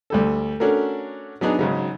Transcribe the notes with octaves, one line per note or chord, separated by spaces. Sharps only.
D2 G3 A4
A3 C#4 D4 F#4 A4 A#4
F#3 B3 D4 D#4 G#4
G#1 C#3 F#3